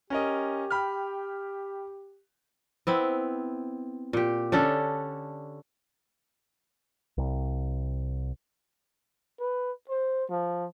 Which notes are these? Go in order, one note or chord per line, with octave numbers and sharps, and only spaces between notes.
C#4 G4 A#4 D#5
G5 B5 F6
B3 C4 E4
A#2 G4
D3 C#4 D4 A4
C2
B4
C5
F3